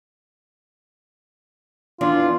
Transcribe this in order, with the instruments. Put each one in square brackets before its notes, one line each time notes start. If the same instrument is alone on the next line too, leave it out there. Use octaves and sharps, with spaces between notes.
[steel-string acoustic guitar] E2 E3 D4 [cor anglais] F4